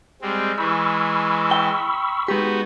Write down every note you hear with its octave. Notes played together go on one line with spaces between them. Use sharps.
G3 G#3 C4
E3 G#3 B5 C#6 E6
G5
G#3 B3 D#4 F#4 G4